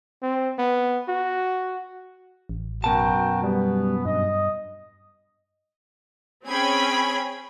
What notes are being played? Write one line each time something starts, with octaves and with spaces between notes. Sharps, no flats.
C4
B3
F#4
A1
F#2 B2 F#4 A#4 G5 A5
G3 B3
G2 D#5
C4 C#4 G#4 G5 B5 G#6